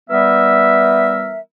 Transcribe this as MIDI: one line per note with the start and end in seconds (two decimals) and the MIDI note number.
0.09 1.38 52
0.09 1.38 55
0.09 1.38 59
0.09 1.38 70
0.09 1.38 76